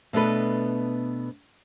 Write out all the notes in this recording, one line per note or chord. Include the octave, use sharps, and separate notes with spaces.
B2 A3 B3 D4 A4 B4